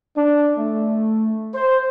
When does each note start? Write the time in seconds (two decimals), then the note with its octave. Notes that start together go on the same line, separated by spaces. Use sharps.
0.17 D4
0.58 A3
1.55 C5